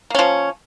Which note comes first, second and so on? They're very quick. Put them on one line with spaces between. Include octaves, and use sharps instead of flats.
A#3 C#4 F3